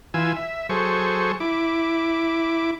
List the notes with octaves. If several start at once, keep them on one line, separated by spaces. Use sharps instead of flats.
E3 F4 G#5 E6
E5
F#3 G#4 A4 C5 C#6
E4 D6